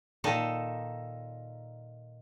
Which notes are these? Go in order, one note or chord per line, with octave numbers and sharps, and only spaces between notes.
A#2 D#3 D#4 A4